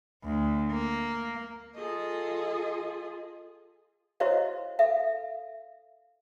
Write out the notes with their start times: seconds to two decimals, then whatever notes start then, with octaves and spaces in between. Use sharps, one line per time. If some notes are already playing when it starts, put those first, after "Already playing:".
0.24 D2
0.71 A#3
1.76 F4 G#4 A4 D#5
4.20 E4 F#4 C5 C#5 D#5 F5
4.79 A4 E5 F5